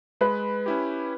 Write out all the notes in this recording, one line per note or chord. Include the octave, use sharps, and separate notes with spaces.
G#3 B4
C#4 E4 G4